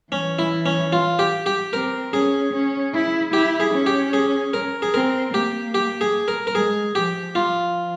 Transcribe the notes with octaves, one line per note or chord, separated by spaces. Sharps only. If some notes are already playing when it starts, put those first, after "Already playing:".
E3 C#4
E4
C#4
F4
G4
G4
C4 A#4
C#4 G#4
C#4
E4
E4 G4
G#4
C#4
G4
G#4
A#4
G#4
C4 A#4
A#3 G4
G4
G#4
A#4
A#4
G#3 G#4
F3 G4
F3 F4